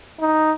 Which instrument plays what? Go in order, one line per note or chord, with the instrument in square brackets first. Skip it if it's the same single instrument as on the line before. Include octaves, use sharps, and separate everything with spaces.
[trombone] D#4